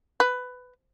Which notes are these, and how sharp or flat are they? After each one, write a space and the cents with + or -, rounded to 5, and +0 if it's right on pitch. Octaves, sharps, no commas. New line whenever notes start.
B4 +15